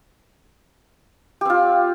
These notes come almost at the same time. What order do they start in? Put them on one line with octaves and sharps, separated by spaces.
G4 C4 F4